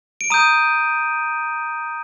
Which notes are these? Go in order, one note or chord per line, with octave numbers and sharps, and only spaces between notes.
D7
A#5 D#6 G6 D#7